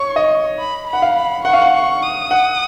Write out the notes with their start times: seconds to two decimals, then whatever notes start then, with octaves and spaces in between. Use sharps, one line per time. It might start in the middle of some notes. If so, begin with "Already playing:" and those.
Already playing: C#5 C#6
0.16 D#5
0.59 B5
0.87 B5
0.93 F#5
1.02 F5
1.16 B5
1.45 F#5 C#6
1.53 F5
1.62 F#5
1.73 C#6
2.02 D#6
2.31 F#5